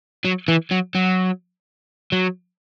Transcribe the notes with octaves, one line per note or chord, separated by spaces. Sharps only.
F#3
E3
F#3
F#3
F#3